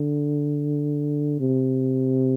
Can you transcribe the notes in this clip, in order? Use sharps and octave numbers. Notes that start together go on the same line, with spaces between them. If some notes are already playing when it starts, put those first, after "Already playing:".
Already playing: D3
C3